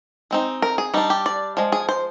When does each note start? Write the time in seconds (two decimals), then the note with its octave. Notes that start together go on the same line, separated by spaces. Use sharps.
0.31 G#3 C4 D#4
0.62 A#4
0.78 G#4
0.94 G3 D4 D#4
1.10 G4
1.26 D5
1.57 F3 G#3
1.72 G#4
1.89 C5